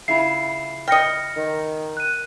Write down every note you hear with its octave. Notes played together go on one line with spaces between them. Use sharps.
C#3 E4 F4 C7
D#5 G5 F6 A#6 C#7
D#3
F#6 D#7